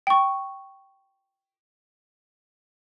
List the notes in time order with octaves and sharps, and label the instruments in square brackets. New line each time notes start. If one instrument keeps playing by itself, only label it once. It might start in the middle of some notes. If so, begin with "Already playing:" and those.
[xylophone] G5 C#6